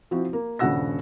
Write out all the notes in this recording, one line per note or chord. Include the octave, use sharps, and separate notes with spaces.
F3 C4 E4 F#4
A#3
D#1 G2 C#3 F#5 E6 A#6